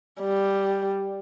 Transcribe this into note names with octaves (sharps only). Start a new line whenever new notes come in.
G3